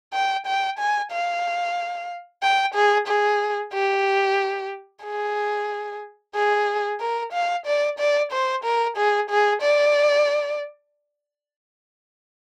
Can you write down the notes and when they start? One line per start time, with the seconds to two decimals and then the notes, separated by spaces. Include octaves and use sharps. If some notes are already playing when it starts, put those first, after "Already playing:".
0.13 G5
0.47 G5
0.79 G#5
1.12 F5
2.43 G5
2.75 G#4
3.08 G#4
3.74 G4
5.04 G#4
6.35 G#4
7.00 A#4
7.33 F5
7.66 D5
7.99 D5
8.32 C5
8.64 A#4
8.97 G#4
9.30 G#4
9.62 D5